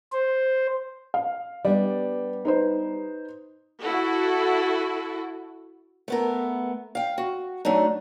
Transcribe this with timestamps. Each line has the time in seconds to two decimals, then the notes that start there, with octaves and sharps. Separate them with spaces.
0.13 C5
1.14 F5
1.65 G3 B3 D4 D5
2.45 D#4 B4 C5
3.81 E4 F#4 A4
6.08 A3 B3 A#4
6.95 F5 G5
7.18 F#4
7.65 F#3 A3 D4 D#4